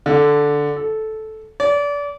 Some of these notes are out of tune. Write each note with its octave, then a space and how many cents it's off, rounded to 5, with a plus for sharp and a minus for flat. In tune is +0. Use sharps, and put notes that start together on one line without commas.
D3 -5
A4 -10
D5 -30